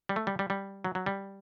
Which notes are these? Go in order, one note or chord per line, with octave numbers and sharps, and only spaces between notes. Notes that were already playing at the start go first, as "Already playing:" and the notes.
G3
A3
G3
G3
G3
F#3
F#3
G3